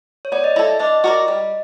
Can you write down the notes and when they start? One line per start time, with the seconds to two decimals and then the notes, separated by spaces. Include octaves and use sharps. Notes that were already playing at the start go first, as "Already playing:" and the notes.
0.25 C#5
0.32 B3 D5
0.44 D#5
0.56 E4 A4 E5
0.68 E5
0.79 D4 D#5
1.04 F#4 A#4 D5
1.28 G3